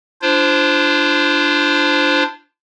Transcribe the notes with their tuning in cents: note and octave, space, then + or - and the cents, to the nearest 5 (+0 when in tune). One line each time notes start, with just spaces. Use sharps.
D4 +0 F4 -35 C5 +0